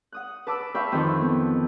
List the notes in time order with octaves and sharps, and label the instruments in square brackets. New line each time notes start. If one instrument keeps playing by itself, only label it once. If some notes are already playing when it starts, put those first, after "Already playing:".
[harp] F#5 D#6 F#6
B4 A5 D6 E6
E5 F5 G5 B5 C#6 E6
F2 D#3 E3 A4 G5
B3